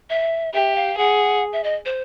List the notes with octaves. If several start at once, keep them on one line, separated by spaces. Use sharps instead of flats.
E5
G4 E5
F5
G#4 F#5
E5
D#5
C5